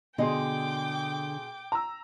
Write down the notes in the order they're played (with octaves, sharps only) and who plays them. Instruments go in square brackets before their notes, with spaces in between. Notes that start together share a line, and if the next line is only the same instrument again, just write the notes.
[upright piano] B2 G#4 C6 [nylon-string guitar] D3 D#5 [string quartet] G5 D6
[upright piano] A#5 E6